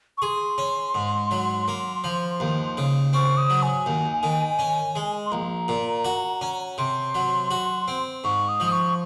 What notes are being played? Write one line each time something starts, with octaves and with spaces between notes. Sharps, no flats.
C#6
G#4 C6
C#4
G#2
F#3
A#3
F3
D#2
C#3
C4 C#6
D#6
F#3
G#5
D#2
D#3
C#4
G#3
C6
A#1 A#5
A#2
F#4
C#4
C3 C6
F#3
F#4
C4
G#2 C#6
D#6
F3
D#6
C#6